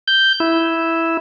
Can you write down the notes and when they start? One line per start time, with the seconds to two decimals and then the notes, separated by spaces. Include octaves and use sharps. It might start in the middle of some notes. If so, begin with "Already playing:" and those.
0.08 G6
0.40 E4